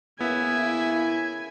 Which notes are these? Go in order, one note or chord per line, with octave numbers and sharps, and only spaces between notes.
C#3 A#3 B3 E4 E5 G#5 G#6